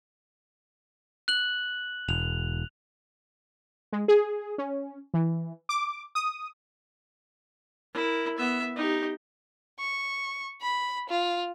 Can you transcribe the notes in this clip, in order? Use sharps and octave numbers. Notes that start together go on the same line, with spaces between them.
F#6 F#7
E1 F7
G#3
G#4
C#4
E3
D6
D#6
E4 A#4
B3 E5
D#4 G4
C#6
B5
F4